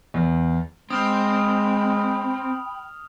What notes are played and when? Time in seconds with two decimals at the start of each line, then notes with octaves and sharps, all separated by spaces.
0.14 E2
0.90 G#3 C4 G5 B5 D#6 F6 F7